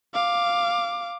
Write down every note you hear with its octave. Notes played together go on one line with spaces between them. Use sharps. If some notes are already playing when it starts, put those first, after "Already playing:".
F5 D6